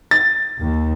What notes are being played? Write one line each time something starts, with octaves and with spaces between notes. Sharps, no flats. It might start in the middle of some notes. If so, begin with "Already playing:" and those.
A6
D#2